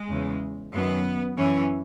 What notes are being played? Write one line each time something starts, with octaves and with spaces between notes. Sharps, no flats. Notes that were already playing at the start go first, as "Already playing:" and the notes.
Already playing: G#3
E2 C#3 E3
F#2 D#3 B3
F#2 E3 C#4